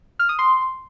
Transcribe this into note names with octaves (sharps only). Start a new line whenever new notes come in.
F6
D#6
C6